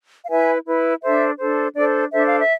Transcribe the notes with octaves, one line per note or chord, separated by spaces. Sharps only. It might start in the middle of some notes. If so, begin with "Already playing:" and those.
F5
E4 B4 E5 G#5
E4 B4
D4 A4 C5 E5
D4 A4 C5
D4 A4 C5 D5
D4 A4 C5 E5
F5
E5